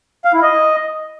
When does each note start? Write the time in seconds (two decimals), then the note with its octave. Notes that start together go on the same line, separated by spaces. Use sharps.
0.25 F5
0.34 E4
0.43 D#5